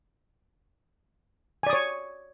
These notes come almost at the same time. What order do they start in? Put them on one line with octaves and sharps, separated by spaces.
G#5 D5 D#6 C#5